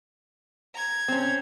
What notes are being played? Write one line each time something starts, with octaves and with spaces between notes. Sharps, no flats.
A#5 G#6
C4 C#4